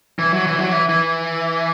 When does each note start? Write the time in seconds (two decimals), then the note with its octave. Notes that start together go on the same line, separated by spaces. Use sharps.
0.19 E3
0.32 F#3
0.46 E3
0.59 F#3
0.72 E3
0.89 E3